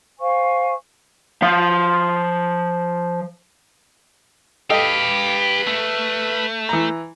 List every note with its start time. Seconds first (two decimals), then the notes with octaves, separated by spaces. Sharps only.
0.20 C5 F5 G#5 C#6
1.42 F3 F5
4.70 G4 A4 B4 D#5 F5 G5
5.67 A3
6.69 E3 A#5